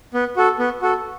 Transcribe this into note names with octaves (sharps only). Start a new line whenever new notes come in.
B3
F#4 A4
B3
F#4 A4